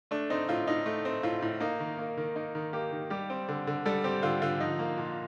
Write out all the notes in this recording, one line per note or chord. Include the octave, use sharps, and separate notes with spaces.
A3 D4
C4 D#4
A2 F4
A2 D#4
A3
C4
A2 F4
A2
A#3 D#4
D#3
A#3
D#3
A#3 D#4
D#3
A#3 G4
D#3
G3 G4
C4
D3
D3
G3 A4
C4 G4
D3 F4
D3 F4
F3 D#4
A#3
A#2